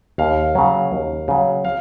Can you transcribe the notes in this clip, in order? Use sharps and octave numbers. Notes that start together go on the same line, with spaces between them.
D#2 F5
C#3 F#3
D#2
C#3 F#3
F5